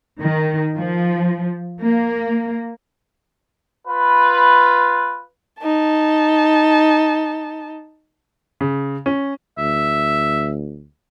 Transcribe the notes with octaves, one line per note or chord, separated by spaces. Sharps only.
D#3
F3
A#3
F4 B4
D#4 A5
C#3
C#4
D2 E5